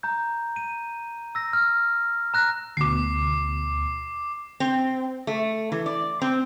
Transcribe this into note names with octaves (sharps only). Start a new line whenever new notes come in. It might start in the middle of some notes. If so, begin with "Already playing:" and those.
A#5 G6
D#7
E6 A#6
F6
A#5 F#6 A#6
D2 B2 D6 C7
C4
A3
E3
D5
C4